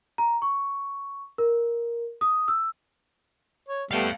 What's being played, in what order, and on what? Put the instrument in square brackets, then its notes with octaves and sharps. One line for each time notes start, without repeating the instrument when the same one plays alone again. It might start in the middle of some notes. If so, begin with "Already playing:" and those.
[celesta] A#5
C#6
A#4
D#6
E6
[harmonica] C#5
[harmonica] G3 A3 B3 [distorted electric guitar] F5 G5